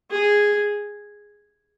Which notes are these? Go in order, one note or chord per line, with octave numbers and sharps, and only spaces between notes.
G#4